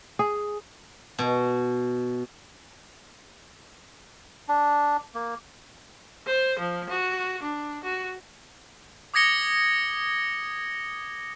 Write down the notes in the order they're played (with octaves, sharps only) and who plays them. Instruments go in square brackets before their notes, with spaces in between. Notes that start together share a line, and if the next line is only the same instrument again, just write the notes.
[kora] G#4
[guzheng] B2
[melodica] D4
A#3
[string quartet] C5
F3
F#4
D4
F#4
[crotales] D6 D#6 G#6 A#6 C#7 G7